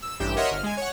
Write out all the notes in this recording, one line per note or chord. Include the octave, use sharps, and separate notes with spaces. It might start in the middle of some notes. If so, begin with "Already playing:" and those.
E6
A1 G2 G4 E7
A#4 C#5 D#5 E5 F#5 C6
G1 F6
G#3 G#5
C#5 F#5